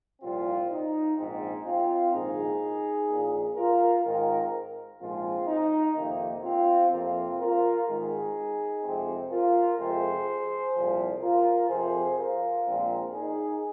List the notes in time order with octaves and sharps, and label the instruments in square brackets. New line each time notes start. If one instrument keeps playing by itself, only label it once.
[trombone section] C2 A#2 F3 C4 F4
D#4
A#1 G#2 G#3 C4 D#4
C4 F4
A#1 G#2 D#3 D#4 G#4
A#1 A#2 A#3
F4 A#4
G#2 D#3 G#3 C4 F4 A#4
A#1 G#2 F3 G#3 C4 F4
D#4
F2 C3 D#3 A#3
C4 F4
F2 C3 F3 A#3 C4 F4
F4 A#4
G#1 G#2 D#3 G#3 D#4 G#4
F2 C3 G#3 C4
F4 A#4
F2 C3 G#3 C4 G#4 C5
C2 A#2 F3
F4 A#4
F2 C3 F3 G#4 C5
F4 A#4
A#1 A#2 G#3 C4
D#4 G#4